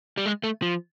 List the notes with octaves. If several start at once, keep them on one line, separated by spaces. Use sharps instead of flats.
G3
G#3
A3
F3